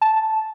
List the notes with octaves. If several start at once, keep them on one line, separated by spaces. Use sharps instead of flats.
A5